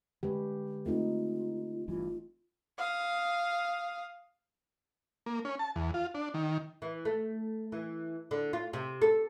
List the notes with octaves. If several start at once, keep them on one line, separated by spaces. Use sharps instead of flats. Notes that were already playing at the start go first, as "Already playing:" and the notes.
D3 G#3 C#4 G4 B4
A3 C4 D#4 F4
G1 G2 E3 F4
F5 D#6
A#3
C#4
A5
E2
F4
D4
D#3
E3
A3
E3
D3
F4
C3
A4